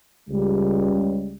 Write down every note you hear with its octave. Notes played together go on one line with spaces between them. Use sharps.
C#2 G3